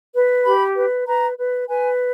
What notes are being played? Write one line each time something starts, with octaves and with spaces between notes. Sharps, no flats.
B4
G4 B5
B4
B4 A#5
B4
B4 G#5